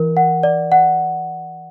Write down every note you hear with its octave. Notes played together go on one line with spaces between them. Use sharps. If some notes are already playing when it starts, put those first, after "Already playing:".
Already playing: E3 A#4
F#5
D5
F#5